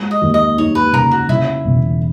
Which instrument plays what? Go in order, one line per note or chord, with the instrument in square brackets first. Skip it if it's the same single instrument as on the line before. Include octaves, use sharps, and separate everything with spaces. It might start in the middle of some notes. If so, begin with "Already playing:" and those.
Already playing: [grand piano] G#3
[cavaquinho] D#5
[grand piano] D#2
[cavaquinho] D#5
[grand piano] D#4 [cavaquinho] C#5
[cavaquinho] B4
[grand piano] C#3 [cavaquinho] A#4
[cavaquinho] F#4
[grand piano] C#3 [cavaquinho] E4
[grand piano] E1